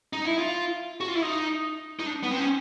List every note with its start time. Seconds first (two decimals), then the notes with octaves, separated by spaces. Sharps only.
0.13 D#4
0.25 E4
0.38 F4
1.01 F#4
1.08 F4
1.15 E4
1.22 D#4
1.99 D#4
2.06 D4
2.23 B3
2.31 C4
2.40 C#4